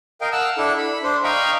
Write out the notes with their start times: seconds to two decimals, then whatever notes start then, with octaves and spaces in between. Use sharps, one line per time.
0.21 A#4 D#5 F5 G5
0.32 F#5 A5 E6 F6
0.57 D4 E4 A4
0.77 B5
1.04 D4 C5
1.24 D#5 F5 G5 A#5 B5 C#6